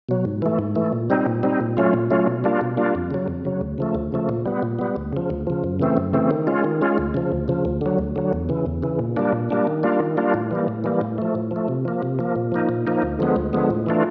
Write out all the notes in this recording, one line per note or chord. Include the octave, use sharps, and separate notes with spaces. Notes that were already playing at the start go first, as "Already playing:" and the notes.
B2 F#3
G#2
E3 A3
G#2
E3 A3
A#2
G3 C4 D#4
A#2
G3 C4 D#4
A#2
F#3 A3 C#4 F4
A#2
F#3 A3 C#4 F4
B2
G3 A#3 D4 F4
B2
G3 A#3 D4 F4
F2
C#3 F#3
F2
C#3 F#3
D2
C#3 F3 A3
D2
C#3 F3 A3
A#2
G3 B3
A#2
G3 B3
D2
C#3 F3
D2
C#3 F3
F#2
C#3 E3 A3 C4
F#2
C#3 E3 A3 C4
D#3
G#3 C#4 F4
D#3
G#3 C#4 F4
D2
C#3 F3
D2
C#3 F3
D2
D3 F#3
D2
D3 F#3
E2
C#3 E3
E2
C#3 E3
A#2
G3 A#3 D4
A#2
G3 A#3 D4
D#3
G3 A#3 D4 F4
D#3
G3 A#3 D4 F4
A2
E3 G3 A#3
A2
E3 G3 A#3
A2
F3 A3
A2
F3 A3
C3
F3 A#3
C3
F3 A#3
A#2
F3 A#3 D#4
A#2
F3 A#3 D#4
D2
D3 F3 G#3 B3
D2
D3 F3 G#3 B3
A2
E3 A3 D4 F4